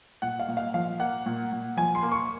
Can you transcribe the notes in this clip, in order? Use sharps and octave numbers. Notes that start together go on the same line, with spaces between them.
A#2 F#5
F5
A#2
F5
F3 F5
A#3 F#5
A#2
A#2
F3 G#5
C6
A#3
C#6